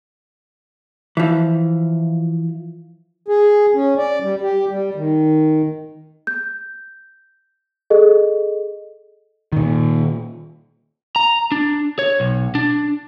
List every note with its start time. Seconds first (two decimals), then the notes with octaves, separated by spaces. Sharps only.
1.17 E3 F3
3.28 G#4
3.74 C#4
3.98 D5
4.22 G3
4.41 G4
4.69 G3
4.95 D#3
6.27 G6
7.90 G#4 A4 D#5
9.52 A#2 D#3
11.16 A#5
11.52 D4
11.99 C#5
12.20 B1
12.55 D4